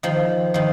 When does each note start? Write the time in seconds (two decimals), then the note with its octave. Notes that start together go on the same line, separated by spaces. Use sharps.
0.03 D#3 F3
0.54 D#3 F3